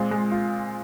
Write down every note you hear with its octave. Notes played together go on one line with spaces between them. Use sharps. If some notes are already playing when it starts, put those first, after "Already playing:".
Already playing: A#2 G#3 C4 F4
G#3
F4